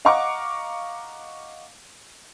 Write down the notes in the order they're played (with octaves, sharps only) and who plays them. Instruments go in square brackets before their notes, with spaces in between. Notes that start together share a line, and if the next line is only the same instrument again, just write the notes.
[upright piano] D#5 F5 F#5 A#5 C#6 D6